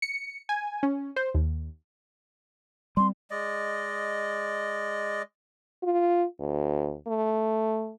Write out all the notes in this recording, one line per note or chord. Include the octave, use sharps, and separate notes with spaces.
C#7
G#5
C#4
C5
D#2
G3 C4 C6
G#3 D5 D#5
F4
D2
A3